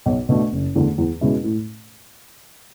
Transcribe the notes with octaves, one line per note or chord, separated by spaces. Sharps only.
B1
B2 A3 D4
F#1
E2 D3 A3
E2
B2 G#3 C#4 E4
A2